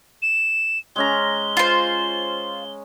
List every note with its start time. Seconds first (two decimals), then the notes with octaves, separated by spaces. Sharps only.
0.22 E7
0.96 G#3 C#4 A#5 G7
1.57 F4 C5